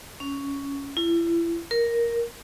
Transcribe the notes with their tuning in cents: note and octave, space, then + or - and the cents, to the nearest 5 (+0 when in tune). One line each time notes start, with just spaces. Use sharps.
C#4 +10
E4 +35
A#4 +5